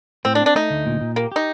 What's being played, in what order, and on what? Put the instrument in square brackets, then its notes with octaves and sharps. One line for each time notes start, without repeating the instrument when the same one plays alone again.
[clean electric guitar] A2 [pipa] C4
[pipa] D4
[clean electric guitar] C4
[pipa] D4
[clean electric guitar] A3 [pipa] D#4
[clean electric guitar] D2
A#2
A#2
[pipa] A#3 [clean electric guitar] G4
[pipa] D#4 [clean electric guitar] G4